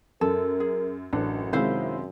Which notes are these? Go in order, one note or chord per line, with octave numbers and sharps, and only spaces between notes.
F#2 A4 A#4
G#4
A1 F#2 D4
C3 D#3 G#3 E4 C5 F5